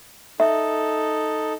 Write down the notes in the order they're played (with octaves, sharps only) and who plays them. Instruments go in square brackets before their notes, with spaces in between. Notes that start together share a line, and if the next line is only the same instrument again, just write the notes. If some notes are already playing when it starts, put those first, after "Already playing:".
[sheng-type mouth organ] D#4 A4 [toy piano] E5